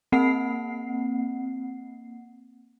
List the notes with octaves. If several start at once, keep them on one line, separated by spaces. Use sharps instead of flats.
A#3 C4 F#5 C7